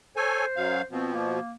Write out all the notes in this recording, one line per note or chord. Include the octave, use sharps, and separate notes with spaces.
A4 C5 C#5 G#5
F#2 F#3 F5
B2 F3 C4
A#3